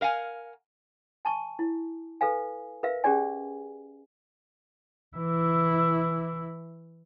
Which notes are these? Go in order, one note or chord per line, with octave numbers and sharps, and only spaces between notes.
A#4 F5 F#5 G#5
G#5 A5 C#6
E4
A4 B4 F5 G#5
A#4 B4 E5 F5
C#4 G4 G#4 D5 G#5
E3 E4